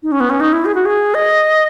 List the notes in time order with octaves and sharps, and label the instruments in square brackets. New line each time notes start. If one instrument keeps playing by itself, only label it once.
[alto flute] D#4
C#4
B3
C#4
D#4
E4
G#4
F#4
G#4
D#5